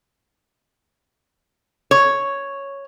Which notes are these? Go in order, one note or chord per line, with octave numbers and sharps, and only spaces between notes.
C#5